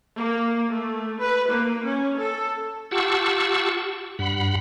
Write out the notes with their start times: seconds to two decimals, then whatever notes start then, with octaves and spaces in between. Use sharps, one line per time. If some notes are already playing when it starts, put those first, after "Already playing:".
0.17 A#3
0.72 A3
1.20 B4
1.51 A#3
1.87 C#4
2.20 A4
2.91 F4 G4 F#5 A5 C#6 E6
4.19 G2 F#5 B5